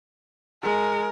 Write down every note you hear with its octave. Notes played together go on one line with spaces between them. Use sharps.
G#3 A#4